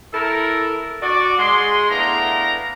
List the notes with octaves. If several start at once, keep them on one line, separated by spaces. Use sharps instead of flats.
E4 A4 A#4
F#4 D5
G#3 C6
A3 B3 D4 E4 F5 A#5